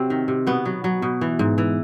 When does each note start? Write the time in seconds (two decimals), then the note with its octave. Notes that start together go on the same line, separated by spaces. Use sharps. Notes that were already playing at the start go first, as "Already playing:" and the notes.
Already playing: C3 F#3 C4
0.10 D#3
0.28 C3
0.47 B2 B3
0.65 F#3
0.84 F#3
1.02 B2
1.21 E3
1.39 G#2
1.58 E3